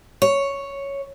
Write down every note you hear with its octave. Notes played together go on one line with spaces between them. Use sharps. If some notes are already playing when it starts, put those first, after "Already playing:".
C#5